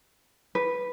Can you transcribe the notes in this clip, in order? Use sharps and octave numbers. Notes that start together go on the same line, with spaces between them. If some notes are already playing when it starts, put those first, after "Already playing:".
B4